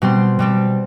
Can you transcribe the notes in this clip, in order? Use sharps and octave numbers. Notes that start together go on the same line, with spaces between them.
B2 G3 C4 C6
B2 G3 C4